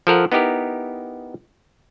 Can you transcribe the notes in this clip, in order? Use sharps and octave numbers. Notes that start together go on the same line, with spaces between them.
F3 A4 A#4 F#5
B3 D#4 E4 G4 A#4